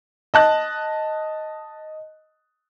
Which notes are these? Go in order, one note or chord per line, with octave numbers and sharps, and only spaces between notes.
D#5 A5 F#6